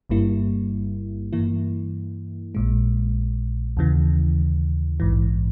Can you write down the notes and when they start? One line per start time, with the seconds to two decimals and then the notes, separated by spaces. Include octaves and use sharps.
0.10 G1 G2 G3 A#3 E4
1.33 G2 E3 A#3 E4
2.55 A#1 A#2 G#3
3.77 D#2 C#3 E3
5.00 A#1 G#2 E3